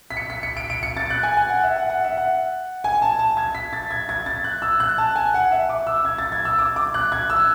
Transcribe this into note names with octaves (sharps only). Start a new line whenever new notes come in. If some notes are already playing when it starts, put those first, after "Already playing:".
B6
C#7
B6
C#7
D7
D7
C#7
A6
F#6
G#5
G#5
F#5
E5
F#5
F#5
E5
F#5
G#5
A5
A5
G#6
B6
A6
G#6
G#6
A6
F#6
E6
F#6
A5
G#5
F#5
E5
D6
E6
G#6
A6
G#6
E6
D6
D6
F#6
G#6
E6